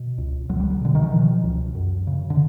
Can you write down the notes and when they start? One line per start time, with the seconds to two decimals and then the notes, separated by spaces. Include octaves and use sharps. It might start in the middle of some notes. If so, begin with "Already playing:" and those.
Already playing: B2
0.18 C#2
0.49 C#2 F#3
0.60 G3
0.70 F#3
0.81 B2 D3
0.95 D#3
1.03 E3
1.12 B2 F3
1.44 C#2
1.75 F#2
2.07 C#3
2.30 D3